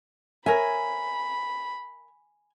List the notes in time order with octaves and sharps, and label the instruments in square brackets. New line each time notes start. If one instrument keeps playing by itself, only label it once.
[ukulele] A#4 C#5 E5 [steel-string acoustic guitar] G#5 [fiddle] B5